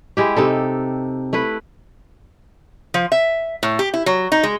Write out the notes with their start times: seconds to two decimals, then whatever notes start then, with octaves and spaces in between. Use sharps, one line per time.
0.17 G#3 E4 G4
0.37 C3 D#4 A4
1.33 A3 E4 B4
2.94 F3
3.12 E5
3.63 A2
3.79 G4
3.94 E4
4.06 F#3
4.32 D#4
4.43 G#3